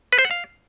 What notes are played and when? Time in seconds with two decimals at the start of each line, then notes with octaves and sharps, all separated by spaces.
0.13 B4
0.19 C5
0.25 F#5
0.31 F5